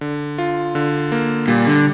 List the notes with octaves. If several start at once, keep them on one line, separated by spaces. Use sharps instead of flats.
D3
F4
D3
A#3
A#2 G3
D3